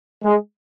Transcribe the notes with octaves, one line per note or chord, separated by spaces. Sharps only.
G#3